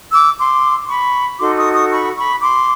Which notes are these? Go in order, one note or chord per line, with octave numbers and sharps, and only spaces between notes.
D6 E6
C6 D6
B5 C#6
D#4 F#4 A4 C6 D6
C#6 D#6
C#6 D#6
B5 C#6
B5 C#6
C6 D6